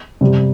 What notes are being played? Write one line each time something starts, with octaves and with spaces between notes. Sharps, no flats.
C3 G3